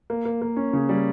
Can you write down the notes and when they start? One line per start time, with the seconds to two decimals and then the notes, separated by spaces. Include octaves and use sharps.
0.10 A#3
0.25 A#3
0.42 A#3
0.56 C#4
0.73 C#3
0.89 G3